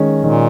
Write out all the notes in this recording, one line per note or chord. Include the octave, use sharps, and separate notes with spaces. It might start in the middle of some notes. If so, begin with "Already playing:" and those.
Already playing: D#3 G#3 C#4
A#2 D#3